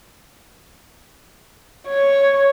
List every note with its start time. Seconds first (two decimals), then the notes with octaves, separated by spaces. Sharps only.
1.88 C#5